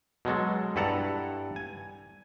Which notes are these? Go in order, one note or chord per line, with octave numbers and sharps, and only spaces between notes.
B2 F#3 G#3 A4
G2 E4 A4 F#5 A5 A#5
G#5